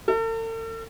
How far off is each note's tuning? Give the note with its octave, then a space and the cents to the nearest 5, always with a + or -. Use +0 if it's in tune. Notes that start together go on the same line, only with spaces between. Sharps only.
A4 +45